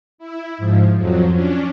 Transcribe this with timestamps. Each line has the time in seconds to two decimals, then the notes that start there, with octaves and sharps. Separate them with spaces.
0.18 E4
0.58 G#2 F3
0.97 F2 F3 F#3
1.31 C#4 D4